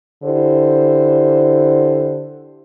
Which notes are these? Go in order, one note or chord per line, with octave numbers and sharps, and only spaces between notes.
D3 E4 G4 C5